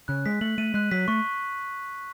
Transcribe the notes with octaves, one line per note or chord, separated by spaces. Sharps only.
C#3 F#6
G#3 B6
A3 F#7
A3 D#7
G#3 F#6
F#3 B6
A3 C#6